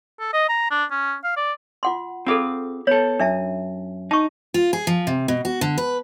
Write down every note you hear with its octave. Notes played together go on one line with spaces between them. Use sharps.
A4
D#5
A#5
D4
C#4
F5
D5
F4 F#5 C6
C4 F4 G#4 A4 F5
B3 A4 C#5
F#2 D4 E5 A5
D#4 A5 C#6
F4
G#4
F3
C3
B2
F#4
D3
B4